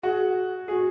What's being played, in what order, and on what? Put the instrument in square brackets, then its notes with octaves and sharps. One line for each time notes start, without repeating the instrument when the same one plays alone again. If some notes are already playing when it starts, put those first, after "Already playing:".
[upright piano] F#4 [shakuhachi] G#4
[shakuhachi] F#4 [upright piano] G#4